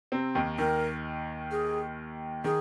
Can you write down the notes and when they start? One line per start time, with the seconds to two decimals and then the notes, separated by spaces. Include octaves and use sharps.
0.12 C3 C4
0.35 D#2 D#3
0.58 D#2 D#3 A#4
1.51 G#4
2.44 D#3 G#4